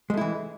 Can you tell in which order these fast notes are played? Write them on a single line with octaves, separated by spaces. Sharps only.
G#3 A3 E4 E3